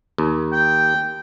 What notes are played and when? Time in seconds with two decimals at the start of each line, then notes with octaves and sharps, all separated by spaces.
0.18 D#2
0.52 G5